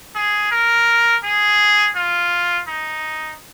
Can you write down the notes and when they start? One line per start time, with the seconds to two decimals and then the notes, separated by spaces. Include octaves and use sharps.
0.15 G#4
0.52 A#4
1.24 G#4
1.96 F4
2.68 D#4